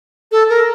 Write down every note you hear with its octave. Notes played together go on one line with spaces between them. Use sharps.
A4
A#4